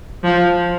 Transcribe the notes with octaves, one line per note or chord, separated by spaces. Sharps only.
F3